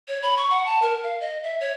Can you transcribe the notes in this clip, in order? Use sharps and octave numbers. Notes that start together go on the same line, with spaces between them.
C#5
B5
C#6
F#5
A5
A#4
F5
D#5
E5
C#5